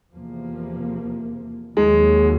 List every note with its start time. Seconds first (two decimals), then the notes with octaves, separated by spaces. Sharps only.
0.13 E2 C3 F3 A#3
1.77 D#2 D#3 F#3 G#3